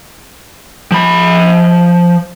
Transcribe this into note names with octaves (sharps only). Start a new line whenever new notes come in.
F3 B5